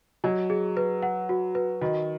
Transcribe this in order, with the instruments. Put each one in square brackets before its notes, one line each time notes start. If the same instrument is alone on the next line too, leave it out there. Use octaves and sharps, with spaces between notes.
[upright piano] F#3 [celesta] D#5
[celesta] G#4
B4
F#5
F#4
B4
[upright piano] D#3 [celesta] F#4